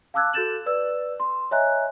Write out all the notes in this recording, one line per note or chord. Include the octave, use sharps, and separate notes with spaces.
F5 A5 D6 E6 F#6 G#6
F#4 A4 G6 A6 E7 F#7
B4 D5 E6
C6
C#5 D#5 E5 G#5 A#5 F#6